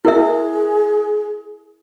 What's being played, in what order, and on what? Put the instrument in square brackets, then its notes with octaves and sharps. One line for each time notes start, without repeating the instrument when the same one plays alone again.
[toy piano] E4 A#4 E5 [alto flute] G#4